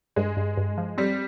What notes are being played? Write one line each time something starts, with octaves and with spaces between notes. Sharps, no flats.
G2 G#3
G2
G2
F3
G3 C4